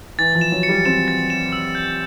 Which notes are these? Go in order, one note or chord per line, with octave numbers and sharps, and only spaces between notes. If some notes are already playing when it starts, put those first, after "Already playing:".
E3 A6
F3
E7
F#3
C#7
G3
C4 E7
A6
E7
E6
G6